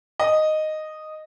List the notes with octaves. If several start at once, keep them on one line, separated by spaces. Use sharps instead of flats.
D#5